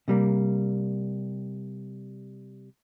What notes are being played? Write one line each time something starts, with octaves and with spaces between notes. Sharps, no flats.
C3 G3 A#3